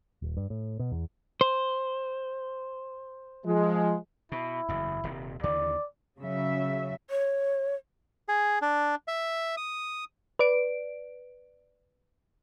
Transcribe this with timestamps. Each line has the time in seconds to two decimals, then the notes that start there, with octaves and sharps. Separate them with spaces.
0.22 D#1
0.37 G2
0.50 A2
0.79 B2
0.92 E2
1.41 C5
3.46 F3 G#3
4.32 B2 E4
4.69 F#1 E2
5.04 D#1 C3
5.43 D#2 D3 E3 D5
6.18 C#3 F#3 E5
7.10 C#5
8.28 G#4
8.62 D4
9.08 E5
9.57 D#6
10.39 B4 D5 D7